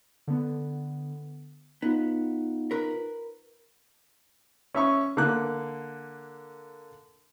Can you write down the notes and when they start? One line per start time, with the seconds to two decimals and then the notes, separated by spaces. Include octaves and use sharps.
0.27 D3 B3
1.82 B3 D#4 F4
2.71 A#4 B4
4.75 C#4 E5 C#6
5.17 D3 A#3 D6 F#6